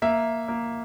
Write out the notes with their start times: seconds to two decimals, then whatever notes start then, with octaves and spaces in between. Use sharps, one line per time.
0.02 A#3 E5
0.48 A#3